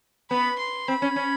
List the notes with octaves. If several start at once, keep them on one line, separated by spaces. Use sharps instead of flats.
B3 B5
C6
C4 B5
C#4
C#4